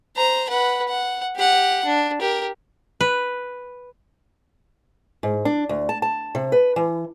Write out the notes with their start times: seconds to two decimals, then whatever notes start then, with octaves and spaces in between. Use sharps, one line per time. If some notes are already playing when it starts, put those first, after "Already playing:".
0.16 C5 A#5
0.49 B4 F#5
0.88 F#5
1.36 G4 F#5
1.85 D4
2.21 G4 A#4
3.01 B4
5.23 G#2
5.45 D4
5.69 D2
5.89 A5
6.02 A5
6.35 C3
6.52 B4
6.76 E3